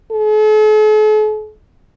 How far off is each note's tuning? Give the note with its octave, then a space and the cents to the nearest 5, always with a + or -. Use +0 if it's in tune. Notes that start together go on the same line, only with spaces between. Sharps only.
A4 -45